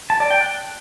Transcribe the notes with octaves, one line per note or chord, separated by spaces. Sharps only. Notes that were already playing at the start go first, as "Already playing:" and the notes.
A5
D5
G5
F#6